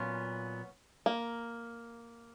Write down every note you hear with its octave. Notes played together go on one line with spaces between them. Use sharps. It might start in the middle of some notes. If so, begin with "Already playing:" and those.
Already playing: A#2 F#3 B3 C#4 F4
A#3